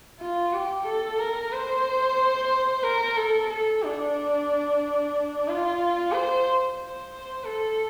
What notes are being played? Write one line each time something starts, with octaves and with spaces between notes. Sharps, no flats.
F4
G4
A4
A#4
C5
A#4
A4
A4
D4
F4
C5
C5
A4